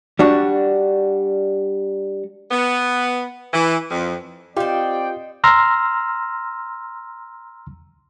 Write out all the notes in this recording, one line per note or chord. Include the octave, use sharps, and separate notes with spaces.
G3 D4 F#4
B3
E3
F2
C4 D#4 F4 G4 C5 D5 F5 G5
A#5 C6 E6 F6 A#6